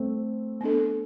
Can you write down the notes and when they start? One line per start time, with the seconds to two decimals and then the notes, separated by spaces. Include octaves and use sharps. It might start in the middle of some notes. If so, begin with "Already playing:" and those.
Already playing: A3 C4
0.61 B3 D4 A4